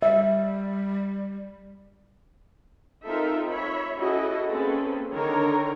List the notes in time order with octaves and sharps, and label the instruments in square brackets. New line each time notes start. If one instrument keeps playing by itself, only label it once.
[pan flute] G3 [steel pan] E5
[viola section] C4 D#4 F4 A4 A#4 E5
C#5 E5 B5
C#4 E4 F#4 G#4 A4 D#5
A#3 C4 C#4 G#4 A4 B4
D3 D#3 A#4 C#5 A#5